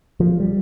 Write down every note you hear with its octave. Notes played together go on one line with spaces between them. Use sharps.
F3
G3